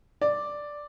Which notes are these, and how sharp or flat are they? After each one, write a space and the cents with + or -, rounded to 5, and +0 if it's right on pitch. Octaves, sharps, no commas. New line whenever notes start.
D5 +0